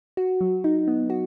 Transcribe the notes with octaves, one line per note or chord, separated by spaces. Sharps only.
F#4
F#3
D#4
B3
F#4